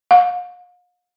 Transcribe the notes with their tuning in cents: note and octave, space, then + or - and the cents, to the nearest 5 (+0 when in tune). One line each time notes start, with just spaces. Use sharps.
F5 +45